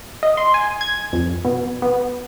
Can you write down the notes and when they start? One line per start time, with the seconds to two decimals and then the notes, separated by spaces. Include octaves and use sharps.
0.23 D#5
0.37 C6
0.54 G#5
0.81 G#6
1.13 F2
1.44 B2
1.82 B3